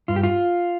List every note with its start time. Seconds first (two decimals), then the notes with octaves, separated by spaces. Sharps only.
0.08 G2 F4
0.16 G4
0.23 F4